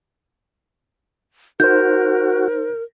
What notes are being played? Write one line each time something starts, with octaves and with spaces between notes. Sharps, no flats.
D#4 F#4 A#4 C5 G6